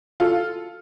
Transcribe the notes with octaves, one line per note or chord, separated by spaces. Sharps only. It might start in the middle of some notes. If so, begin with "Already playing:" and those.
F4 A4